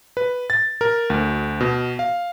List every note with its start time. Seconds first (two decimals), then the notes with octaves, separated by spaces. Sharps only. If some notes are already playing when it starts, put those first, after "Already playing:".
0.17 B4
0.50 A6
0.81 A#4
1.10 D2
1.60 B2
1.99 F5